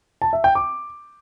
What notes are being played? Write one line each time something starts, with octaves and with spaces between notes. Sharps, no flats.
A5
E5
G5
D6